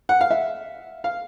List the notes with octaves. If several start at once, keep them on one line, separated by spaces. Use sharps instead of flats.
F#5
F5
E5
F5